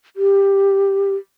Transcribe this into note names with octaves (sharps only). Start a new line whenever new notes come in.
G4